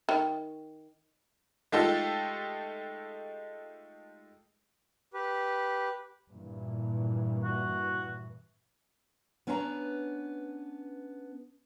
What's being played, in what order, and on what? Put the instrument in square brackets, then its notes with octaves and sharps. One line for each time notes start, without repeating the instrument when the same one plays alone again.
[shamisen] D#3
[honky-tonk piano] G#3 A3 D#4 F4 G4 A4
[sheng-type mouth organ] G4 B4
[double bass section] G2 A#2 E3
[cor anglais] F#4
[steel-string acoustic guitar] B3 C#4 D4 B4 G5 A#5